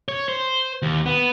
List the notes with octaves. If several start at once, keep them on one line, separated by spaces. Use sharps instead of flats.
C#5
C5
D#2
B3